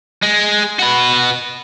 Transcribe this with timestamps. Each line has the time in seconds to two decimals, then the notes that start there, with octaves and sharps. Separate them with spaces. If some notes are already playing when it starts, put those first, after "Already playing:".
0.22 G#3
0.79 F#4 B4